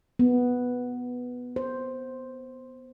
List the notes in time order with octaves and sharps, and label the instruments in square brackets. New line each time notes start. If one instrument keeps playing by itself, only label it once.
[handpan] B3
C5